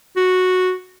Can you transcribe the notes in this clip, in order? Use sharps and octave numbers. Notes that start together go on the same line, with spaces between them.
F#4